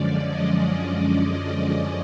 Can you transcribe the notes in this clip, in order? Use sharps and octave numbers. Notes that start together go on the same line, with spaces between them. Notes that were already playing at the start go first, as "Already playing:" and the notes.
Already playing: F#2 D3 F3 G#3 C#4 D5
D#5
D#5